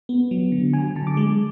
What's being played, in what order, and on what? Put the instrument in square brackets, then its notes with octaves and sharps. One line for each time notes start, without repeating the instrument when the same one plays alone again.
[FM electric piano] B3
F#3
D3
F#3 G#5
D3 A5
D6
G#3